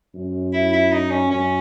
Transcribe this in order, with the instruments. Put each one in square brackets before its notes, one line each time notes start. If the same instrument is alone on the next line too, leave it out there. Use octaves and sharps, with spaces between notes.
[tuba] F#2
[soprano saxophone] E4
E4
D#4
C#4
[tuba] F#2 [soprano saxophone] C#4